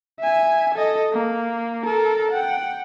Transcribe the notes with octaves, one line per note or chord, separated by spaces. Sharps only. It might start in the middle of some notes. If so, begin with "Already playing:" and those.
E5 G#5
A4 D#5
A#3
A4 A#4
F#5 G5